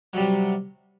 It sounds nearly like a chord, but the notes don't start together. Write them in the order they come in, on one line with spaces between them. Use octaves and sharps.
F#3 G3 C3